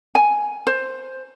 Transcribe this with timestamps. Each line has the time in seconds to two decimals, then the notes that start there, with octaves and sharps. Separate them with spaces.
0.15 G#5
0.67 C5